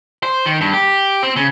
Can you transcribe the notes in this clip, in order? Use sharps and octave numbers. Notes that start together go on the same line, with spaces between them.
C5
D#3
G2
G4
C4
C#3